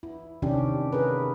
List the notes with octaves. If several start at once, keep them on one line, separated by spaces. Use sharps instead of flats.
E4
C3 D#3 C#4 D4 G4
E4 G#4 A#4 B4